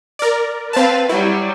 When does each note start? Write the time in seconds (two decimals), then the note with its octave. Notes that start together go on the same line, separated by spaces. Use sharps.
0.19 A#4 D5
0.73 C4 B4 F5 A5
1.09 F#3 G3 E4